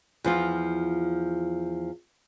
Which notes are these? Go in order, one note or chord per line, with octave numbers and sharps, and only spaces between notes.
E2 F3 F4